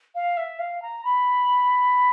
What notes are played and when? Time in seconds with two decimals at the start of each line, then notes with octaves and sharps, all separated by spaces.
0.14 F5
0.37 E5
0.59 F5
0.82 A#5
1.04 B5